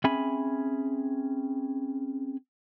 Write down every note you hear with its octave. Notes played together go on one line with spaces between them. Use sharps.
C4 C#4 G#4 E5 G#5 B5